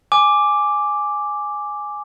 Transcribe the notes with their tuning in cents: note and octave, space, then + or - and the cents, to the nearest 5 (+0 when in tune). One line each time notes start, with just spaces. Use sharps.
G#5 +0 D6 +0